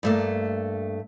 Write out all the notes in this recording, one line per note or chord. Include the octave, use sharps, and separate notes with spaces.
G2 A3 A#3